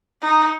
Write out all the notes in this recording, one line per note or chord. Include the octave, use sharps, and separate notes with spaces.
D#4